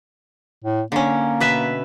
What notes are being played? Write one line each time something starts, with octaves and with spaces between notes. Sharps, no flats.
A2
D3 A#3 C#4
B2 B4 E5